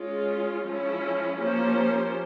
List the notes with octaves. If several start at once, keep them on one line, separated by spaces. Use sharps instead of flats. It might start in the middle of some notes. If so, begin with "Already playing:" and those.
Already playing: G#3 C#4 F4
F3 G#3 C#4 E4
F3 A#3 C#4 G4 C5